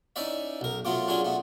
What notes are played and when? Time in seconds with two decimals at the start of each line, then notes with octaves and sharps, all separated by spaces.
0.16 C#4 D#4 E4 D5 E5
0.61 B1 A#4
0.85 F#3 A3 B3 F4 D6
1.08 F#3 C#4 D4 F4 G#4
1.25 A3 B3